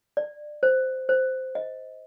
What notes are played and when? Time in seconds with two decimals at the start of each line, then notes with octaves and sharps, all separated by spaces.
0.17 D5
0.63 C5
1.09 C5
1.55 D#5